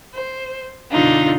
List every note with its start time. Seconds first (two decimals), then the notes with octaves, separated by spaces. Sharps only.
0.14 C5
0.91 F#2 B2 D3 D4 D#4 F4